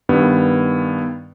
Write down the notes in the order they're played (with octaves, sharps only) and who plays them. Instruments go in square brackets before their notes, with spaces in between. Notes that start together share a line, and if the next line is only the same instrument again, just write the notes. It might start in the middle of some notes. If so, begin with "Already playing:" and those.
[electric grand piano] G2 D#3 B3